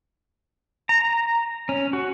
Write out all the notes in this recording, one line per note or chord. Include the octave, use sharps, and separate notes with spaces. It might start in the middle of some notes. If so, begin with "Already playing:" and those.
A#5
C#4
F#4